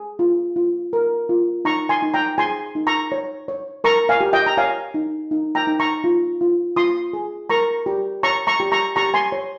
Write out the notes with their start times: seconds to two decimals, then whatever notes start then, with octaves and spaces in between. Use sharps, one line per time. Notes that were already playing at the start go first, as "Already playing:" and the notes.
Already playing: G#4
0.19 F4
0.56 F4
0.93 A#4
1.29 F4
1.65 D#4 A#5 C#6
1.89 G#5 C6
2.03 D#4
2.14 G5 A#5
2.38 G#4 G#5 C6
2.75 D#4
2.87 A#5 C#6
3.12 C#5
3.48 C#5
3.84 A#4 A#5 C#6
4.09 F5 G#5
4.21 G4
4.33 D#5 G5
4.46 A#5
4.57 C#5 F5 G#5
4.94 D#4
5.31 D#4
5.55 G5 A#5
5.67 D#4
5.80 A#5 C#6
6.04 F4
6.41 F4
6.76 F4 C6 D#6
7.13 G#4
7.50 A#4 A#5 C#6
7.86 G4
8.23 C#5 A#5 C#6
8.47 A#5 C#6
8.60 G4
8.72 A#5 C#6
8.96 G4 A#5 C#6
9.14 G#5 C6
9.32 C#5